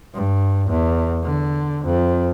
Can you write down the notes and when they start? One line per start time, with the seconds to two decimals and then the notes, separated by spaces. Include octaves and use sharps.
0.14 G2
0.70 E2
1.23 D3
1.85 F2